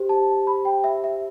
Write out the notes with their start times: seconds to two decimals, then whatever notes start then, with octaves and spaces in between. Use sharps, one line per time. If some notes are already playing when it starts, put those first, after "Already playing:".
Already playing: G4 C5
0.09 A5
0.47 B5
0.65 G5
0.84 E5
1.04 E5